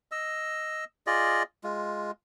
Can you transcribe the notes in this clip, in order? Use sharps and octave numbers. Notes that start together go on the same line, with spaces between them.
D#5 E6
F4 G#4 D5 D#5
G#3 F4